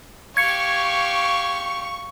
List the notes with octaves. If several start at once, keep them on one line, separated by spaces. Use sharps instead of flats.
G4 F5 C#6 G#6 C#7